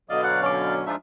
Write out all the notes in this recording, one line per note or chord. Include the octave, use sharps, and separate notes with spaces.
B2 D3 F#3 D5 D#5 F5
F#5
C#4 C#5 D6
F3 G#3 D4 D#4 F4 E5